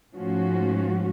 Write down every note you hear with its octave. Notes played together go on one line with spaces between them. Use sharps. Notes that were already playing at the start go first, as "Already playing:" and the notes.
G#2 F3 A3 C#4 F#4